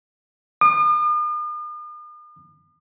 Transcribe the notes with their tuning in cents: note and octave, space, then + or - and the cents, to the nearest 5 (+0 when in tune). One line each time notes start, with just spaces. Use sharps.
D#6 -45